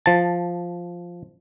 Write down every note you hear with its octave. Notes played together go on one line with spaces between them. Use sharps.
F3 A5